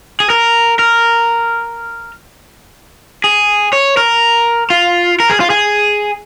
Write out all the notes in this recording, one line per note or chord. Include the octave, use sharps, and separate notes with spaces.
G#4
A#4
A#4
G#4
C#5
A#4
F4
A#4
G#4
F4
G#4